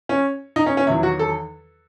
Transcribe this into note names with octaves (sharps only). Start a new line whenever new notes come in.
C#4
D#4
C#4
C#4
E2 D#3 F#3 E4
F#4
A4